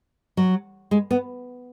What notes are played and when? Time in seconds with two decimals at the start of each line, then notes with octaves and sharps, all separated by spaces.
0.37 F#3
0.91 G#3
1.11 B3